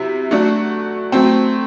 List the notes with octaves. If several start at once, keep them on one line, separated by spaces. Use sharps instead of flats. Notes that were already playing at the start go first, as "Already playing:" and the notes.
Already playing: C3 F#3 E4
F#3 A3 D4 F#4
F#3 A3 C4